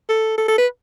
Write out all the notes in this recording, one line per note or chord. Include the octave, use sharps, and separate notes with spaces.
A4
A4
A4
B4